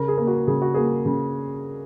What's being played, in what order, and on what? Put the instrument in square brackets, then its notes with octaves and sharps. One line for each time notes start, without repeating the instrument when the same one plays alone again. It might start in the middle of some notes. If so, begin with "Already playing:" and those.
Already playing: [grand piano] C#3 A#4
G#4
A#3
F#4
C#3 G#4
F#4
A#3 G#4
C#3